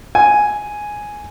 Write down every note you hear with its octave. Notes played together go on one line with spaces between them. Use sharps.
G#5